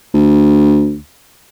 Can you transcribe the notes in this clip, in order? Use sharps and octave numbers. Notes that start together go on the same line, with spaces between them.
D2